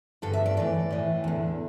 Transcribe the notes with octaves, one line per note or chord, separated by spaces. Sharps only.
G2 D3 A4
E5
D5
A2 E3 D5
A2 E3
E2 D3